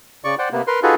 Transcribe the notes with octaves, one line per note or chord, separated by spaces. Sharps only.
C#3 D5 C#6
C5 D5 F#5 G5
C3 A#3 B3
A#4 B4 C6
D#4 F4 F#4 G#4 A4 B4